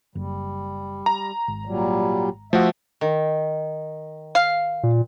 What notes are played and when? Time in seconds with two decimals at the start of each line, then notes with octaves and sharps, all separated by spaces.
0.15 F#1 G3
1.06 A#5
1.48 G#1
1.65 A#2 F#3 G3
2.53 F3 A3 F#4 E5
3.01 D#3
4.35 F5
4.83 A#2